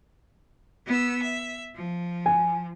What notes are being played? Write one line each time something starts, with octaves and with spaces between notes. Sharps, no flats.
B3 E6
E5
F3
G#5